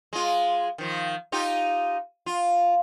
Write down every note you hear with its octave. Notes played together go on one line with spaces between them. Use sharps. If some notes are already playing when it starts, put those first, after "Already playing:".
G#3 F4
D#3 F3
D#4 F4 G4
F4